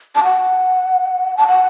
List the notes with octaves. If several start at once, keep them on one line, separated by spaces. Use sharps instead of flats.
A5
F#5
A5
F#5